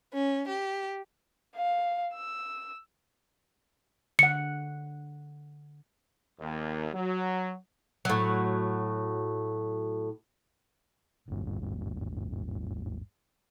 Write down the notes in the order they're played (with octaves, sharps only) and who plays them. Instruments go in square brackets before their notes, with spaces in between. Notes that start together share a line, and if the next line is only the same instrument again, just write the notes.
[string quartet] C#4
G4
[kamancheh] F5
E6
[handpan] D3 F#5 [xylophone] C#7
[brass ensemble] D#2
F#3
[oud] A2 F#3
[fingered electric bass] D#1 G#1 G2